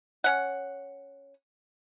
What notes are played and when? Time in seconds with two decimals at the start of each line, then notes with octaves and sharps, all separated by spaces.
0.24 C#4 F#5